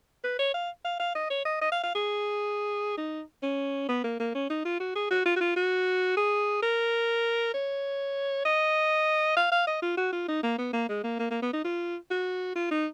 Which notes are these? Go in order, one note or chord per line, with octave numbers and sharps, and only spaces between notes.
B4
C#5
F5
F5
F5
D#5
C#5
D#5
D#5
F5
F5
G#4
D#4
C#4
B3
A#3
A#3
C#4
D#4
F4
F#4
G#4
F#4
F4
F#4
F4
F#4
G#4
A#4
C#5
D#5
F5
F5
D#5
F4
F#4
F4
D#4
A#3
B3
A#3
G#3
A#3
A#3
A#3
B3
D#4
F4
F#4
F4
D#4